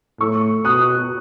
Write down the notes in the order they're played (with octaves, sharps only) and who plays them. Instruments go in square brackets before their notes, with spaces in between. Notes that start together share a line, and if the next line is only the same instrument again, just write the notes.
[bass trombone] A2 [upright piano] C#6 E6
[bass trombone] B2 [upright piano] D#6 F#6